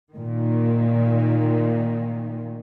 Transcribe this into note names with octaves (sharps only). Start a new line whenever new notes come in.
A#2 D#3